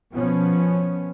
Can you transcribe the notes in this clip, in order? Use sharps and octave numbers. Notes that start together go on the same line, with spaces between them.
B2 F3 B3 C#4